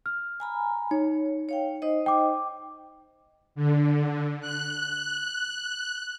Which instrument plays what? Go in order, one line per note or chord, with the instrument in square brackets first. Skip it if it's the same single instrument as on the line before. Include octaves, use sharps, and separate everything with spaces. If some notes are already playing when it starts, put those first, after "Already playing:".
[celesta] F6
[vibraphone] G#5 A#5 B5
[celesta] D#4 [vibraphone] C#5
[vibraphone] C#5 F5 G5
D#4 C5 D#5
[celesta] G5 D6
[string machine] D3
F#6